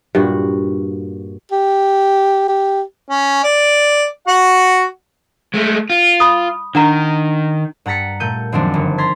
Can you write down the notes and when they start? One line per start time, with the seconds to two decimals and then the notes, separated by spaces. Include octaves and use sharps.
0.15 G2 A#2 F#4
1.52 G4
2.48 G4
3.10 C#4
3.43 D5
4.27 F#4 F#5
5.54 G#3 A3
5.90 F4
6.20 B5 D#6
6.75 D#3 D4 F#5 A#5
7.86 G2 F#5 A#5 A6 B6 C#7
8.20 A#2 A3 G6 D#7
8.52 F#2 D#3 F3 G#3 C4 D4
8.74 G1
8.98 A#5 C6 G#6 A6 B6